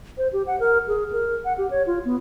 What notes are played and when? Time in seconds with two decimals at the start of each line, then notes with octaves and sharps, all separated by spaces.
0.18 C5
0.33 G4
0.47 F#5
0.60 A#4
0.88 G#4
1.13 A#4
1.45 F#5
1.58 G4
1.71 C#5
1.87 F4
2.05 B3